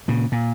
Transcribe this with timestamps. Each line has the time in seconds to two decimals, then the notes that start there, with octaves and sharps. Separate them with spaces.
0.08 A#2 C#3
0.32 A#2